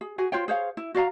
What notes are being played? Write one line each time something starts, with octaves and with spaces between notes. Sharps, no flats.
G#4
F#4 G#4 G#5
F4 C5 C#5 G5
G#4 C5 C#5 F5
E4
F#4 D5 F5 A#5